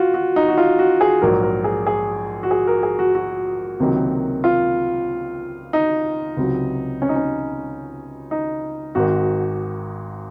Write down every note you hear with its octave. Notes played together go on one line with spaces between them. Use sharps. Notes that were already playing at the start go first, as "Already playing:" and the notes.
Already playing: F4 F#4
F#4
D#4
F#4
F4
F#4
G#4
A#1 G#2 F#3 A#3 A#4
A#4
G#4
G#4
F#4
G#4
A#4
G#4
F#4
F#4
C#2 C3 D#3 F#3 A#3
F4
D#4
C#2 C3 F#3
C#4
D#4
C#4
D#4
G#1 G#2 D#3 F#4